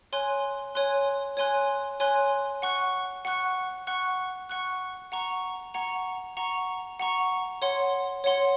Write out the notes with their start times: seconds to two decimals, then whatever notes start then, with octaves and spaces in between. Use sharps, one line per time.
0.13 C#5 G#5 C6 F#6
0.75 C#5 G#5 C6 F#6
1.37 C#5 G#5 C6 F#6
2.00 C#5 G#5 C6 F#6
2.62 F#5 C#6 F#6
3.25 F#5 C#6 F#6
3.87 F#5 C#6 F#6
4.49 F#5 C#6 F#6
5.12 F#5 A#5 C#6
5.74 F#5 A#5 C#6
6.37 F#5 A#5 C#6
6.99 F#5 A#5 C#6
7.62 C#5 F#5 C6
8.24 C#5 F#5 C6